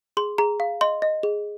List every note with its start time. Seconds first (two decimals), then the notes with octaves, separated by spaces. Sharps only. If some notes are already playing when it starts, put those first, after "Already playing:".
0.17 G#4 C6
0.38 G#4 A#5
0.60 F5
0.81 D#5 C6
1.02 D#5
1.23 G#4